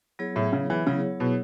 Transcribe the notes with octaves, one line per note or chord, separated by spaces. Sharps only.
F#3 B3 E4 G#4 C#5
A2
C#3
E3
C#3 F#3 B3 E4 G#4 C#5
B2